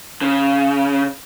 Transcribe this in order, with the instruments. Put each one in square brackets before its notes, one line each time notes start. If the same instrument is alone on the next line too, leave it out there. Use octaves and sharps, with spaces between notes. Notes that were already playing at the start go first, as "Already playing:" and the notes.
[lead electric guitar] C#3